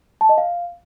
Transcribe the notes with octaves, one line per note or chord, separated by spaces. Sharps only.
A5
D#5
F5